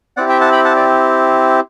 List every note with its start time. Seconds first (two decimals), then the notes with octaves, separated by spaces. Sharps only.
0.17 C4 E4 G4 D5 F#5
0.29 E5 G5
0.41 F#5 A5
0.52 G5 B5
0.64 F#5 A5
0.76 D5